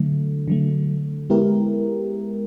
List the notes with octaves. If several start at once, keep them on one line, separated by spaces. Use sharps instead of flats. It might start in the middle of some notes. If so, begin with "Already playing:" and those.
Already playing: D3 F#3 A3
D3 F#3 A3
G#3 B3 E4 G4 A#4